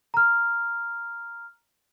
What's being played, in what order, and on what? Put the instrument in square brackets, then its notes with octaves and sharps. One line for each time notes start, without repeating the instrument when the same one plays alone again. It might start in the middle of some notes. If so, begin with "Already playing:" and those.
[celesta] A#5 F6